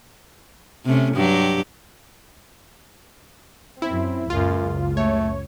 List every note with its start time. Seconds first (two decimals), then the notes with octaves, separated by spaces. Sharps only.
0.85 C3 A3 C#4
1.15 G2 F#3 G4
3.82 F#2 C4 E4
4.30 F#1 C#2 F#2 A#2 F4
4.97 A3 C#5